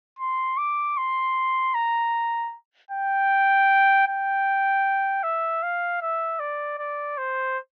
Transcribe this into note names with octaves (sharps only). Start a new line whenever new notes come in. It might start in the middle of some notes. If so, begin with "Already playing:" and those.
C6
D6
C6
A#5
G5
G5
E5
F5
E5
D5
D5
C5